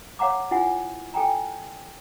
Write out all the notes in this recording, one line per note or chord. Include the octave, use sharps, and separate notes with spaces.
C#5 F5 F#5 A#5 D6
E4 F4 F#5 G#5
A4 G5 G#5 A#5